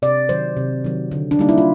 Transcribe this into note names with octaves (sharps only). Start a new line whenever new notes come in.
C3 D5
D#3 F#3 C5
C3
D#3 F#3
D3
D4
G3 A#3 D#4
E4
F4